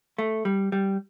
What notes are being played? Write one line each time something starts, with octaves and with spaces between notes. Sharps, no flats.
A3
G3
G3